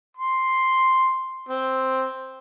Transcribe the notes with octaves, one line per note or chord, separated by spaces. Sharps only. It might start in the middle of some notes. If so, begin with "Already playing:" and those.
C6
C4